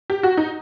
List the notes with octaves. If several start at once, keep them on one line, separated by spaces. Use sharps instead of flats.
G4
F#4
D#4